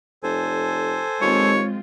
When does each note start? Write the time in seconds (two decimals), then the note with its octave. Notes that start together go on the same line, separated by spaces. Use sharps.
0.23 F1 A4 C5 G#5
1.21 D#2 G#3 C4 F4 C#5